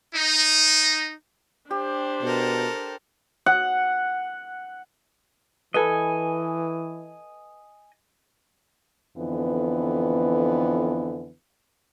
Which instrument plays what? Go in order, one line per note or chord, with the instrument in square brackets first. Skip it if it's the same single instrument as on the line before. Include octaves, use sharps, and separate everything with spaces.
[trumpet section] D#4
[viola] D4 C5 [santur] G4
[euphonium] B2 [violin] A4 A#4
[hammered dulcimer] F#5
[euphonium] E3 [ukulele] A4 B4 [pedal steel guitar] D#5 G#5
[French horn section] F2 D3 E3 B3